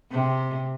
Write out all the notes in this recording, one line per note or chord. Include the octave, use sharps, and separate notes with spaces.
C3